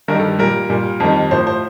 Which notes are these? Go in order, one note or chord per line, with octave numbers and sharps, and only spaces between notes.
G2 D#3 G3 A#4
A4
A#2 G3 A#4
A#2 G3
F2 D#3 G3
A2 F3 C5
C5